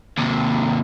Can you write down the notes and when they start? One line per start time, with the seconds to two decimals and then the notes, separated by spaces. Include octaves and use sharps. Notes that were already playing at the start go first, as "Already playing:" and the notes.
0.18 D#2 C3